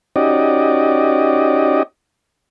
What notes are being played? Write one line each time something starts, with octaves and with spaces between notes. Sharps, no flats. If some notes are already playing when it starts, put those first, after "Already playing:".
C#4 D#4 F#4 G4 D5 D#5